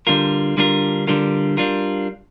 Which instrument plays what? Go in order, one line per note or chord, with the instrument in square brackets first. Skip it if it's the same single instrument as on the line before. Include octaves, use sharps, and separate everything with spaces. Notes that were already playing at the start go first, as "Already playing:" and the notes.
[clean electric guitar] D3 G3 D4 F4 A#4
D3 G3 D4 F4 A#4
D3 G3 D4 F4 A#4
G3 D4 F4 A#4